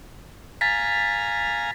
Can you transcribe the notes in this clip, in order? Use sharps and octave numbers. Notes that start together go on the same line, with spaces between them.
F5 G#5 A#5 A6 B6